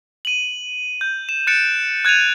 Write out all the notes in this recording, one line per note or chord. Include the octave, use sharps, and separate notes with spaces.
D#7 F#7
G6
E7
F#6 A6 C#7 D7 E7
F#6 G#6 A6 D#7 F7